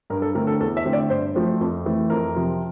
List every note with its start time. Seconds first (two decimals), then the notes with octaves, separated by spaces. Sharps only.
0.10 G2 A#4
0.22 A4
0.35 D3 A3 C4 A#4
0.47 A4
0.60 E2 A4
0.77 E5
0.85 D3 A3 C4
0.93 D5
1.10 G2 C5
1.35 F3 A3 C4
1.61 F2
1.85 E3 A3 C4
2.10 F2 A#4
2.36 C3 F3